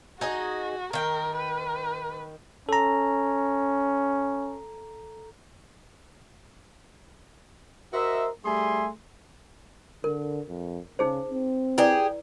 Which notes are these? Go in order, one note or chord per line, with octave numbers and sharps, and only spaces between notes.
D#4 F#4 G#4 D#5
D#3 A#4 G5
B4
C#4 A4 A#5
F#4 A#4 C5 D#5 E5
G3 A3 G#4 E5 G#5 C6
D3 A#4
F2
C#3 D#4 G#4 C5
C4
E4 G4 G#4 B4 D5